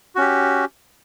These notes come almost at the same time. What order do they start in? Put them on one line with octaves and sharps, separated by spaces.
F#4 C#4 G4